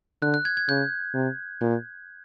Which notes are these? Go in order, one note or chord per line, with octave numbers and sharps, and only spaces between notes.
D3 F#6
F#6
G#6
G#6
C#3 G6
C3
A#2